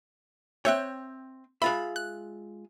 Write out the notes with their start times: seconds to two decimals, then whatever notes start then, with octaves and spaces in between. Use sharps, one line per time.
0.65 C4 C#5 E5 G5 F#6
1.62 G#3 F4 E5 B5
1.96 F#6